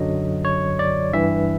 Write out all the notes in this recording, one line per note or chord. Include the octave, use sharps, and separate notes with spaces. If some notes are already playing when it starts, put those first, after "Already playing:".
Already playing: F#2 D3 F#3 D#5
C#5
D5
G2 E3 E5